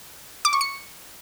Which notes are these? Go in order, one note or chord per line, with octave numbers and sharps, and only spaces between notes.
D6
C#6
C#7